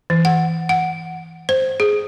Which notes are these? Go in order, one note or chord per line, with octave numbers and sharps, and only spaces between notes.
E3
F#5
F#5
C5
G#4